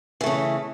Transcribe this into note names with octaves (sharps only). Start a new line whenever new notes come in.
C#3 E3 A3